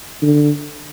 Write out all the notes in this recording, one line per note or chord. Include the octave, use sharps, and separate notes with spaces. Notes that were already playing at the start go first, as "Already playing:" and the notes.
D3